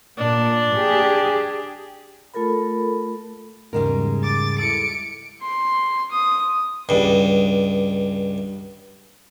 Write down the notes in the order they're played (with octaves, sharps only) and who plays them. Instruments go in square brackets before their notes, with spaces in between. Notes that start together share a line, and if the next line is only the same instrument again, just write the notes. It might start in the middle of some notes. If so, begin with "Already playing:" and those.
[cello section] A#2 [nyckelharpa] D4
[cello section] G4 G#4
[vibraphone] A3 F4 A4 A#4 B5
[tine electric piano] E2 G#2 C#3 [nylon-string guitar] G3 G#3 A#4
[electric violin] D6 A6
[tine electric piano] E4 A4 [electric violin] C#7 D7
[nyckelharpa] C6
D#6
[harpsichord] C#2 G2